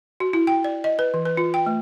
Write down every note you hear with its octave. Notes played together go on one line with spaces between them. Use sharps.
F#4
E4
G5
D5
D#5
B4
E3
B4
F4
G5
A3